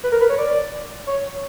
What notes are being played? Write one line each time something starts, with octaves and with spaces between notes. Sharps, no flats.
B4
A#4
B4
C#5
D5
C#5